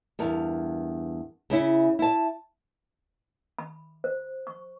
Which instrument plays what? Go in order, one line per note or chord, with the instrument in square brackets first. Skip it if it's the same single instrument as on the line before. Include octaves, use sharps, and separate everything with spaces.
[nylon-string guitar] E2 G2 A#4
C#3 C#4 E4
E4 A5
[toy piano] B5
C5
C#6